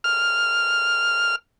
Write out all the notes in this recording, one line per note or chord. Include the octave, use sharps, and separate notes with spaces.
F6